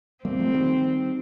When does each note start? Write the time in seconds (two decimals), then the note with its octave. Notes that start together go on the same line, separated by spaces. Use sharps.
0.24 G3 A#3 C4
0.39 F3 A3
0.54 D#3 G3